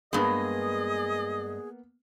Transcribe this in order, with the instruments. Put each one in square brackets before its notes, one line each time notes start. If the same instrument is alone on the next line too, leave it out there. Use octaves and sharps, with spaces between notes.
[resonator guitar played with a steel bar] G2 G#3 [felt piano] A#3 B3 [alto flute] G#4 [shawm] D#5